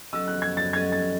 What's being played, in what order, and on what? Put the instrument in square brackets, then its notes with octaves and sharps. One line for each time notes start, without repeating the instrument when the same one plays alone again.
[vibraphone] F#3 C#4 F#4 A4 D#5 [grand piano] E6
[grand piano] F#6
G#6
A6
[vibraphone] F#3 C#4 F#4 A4 D#5 [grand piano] G#6
[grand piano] A6